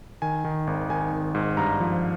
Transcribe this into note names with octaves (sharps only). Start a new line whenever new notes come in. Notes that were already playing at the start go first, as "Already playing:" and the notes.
D#3 G#5
D#3
G#1
D#3 G#5
G#1
G#2
G2 A#5
F3